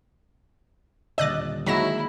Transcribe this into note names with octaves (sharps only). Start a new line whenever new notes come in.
D#1 D3 D5 D#5 E6 F#6 A6
D#3 F#3 G#3 A#3 E4 A#6 E7